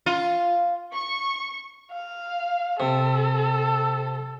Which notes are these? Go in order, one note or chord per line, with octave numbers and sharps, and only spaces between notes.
F4
C#6
F5
C3 A4